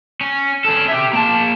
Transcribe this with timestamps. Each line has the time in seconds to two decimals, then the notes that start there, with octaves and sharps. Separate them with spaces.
0.21 C#4
0.65 C#4 A4
0.88 G4 E5
1.13 A#3 A5